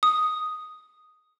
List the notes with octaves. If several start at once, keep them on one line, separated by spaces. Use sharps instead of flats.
D#6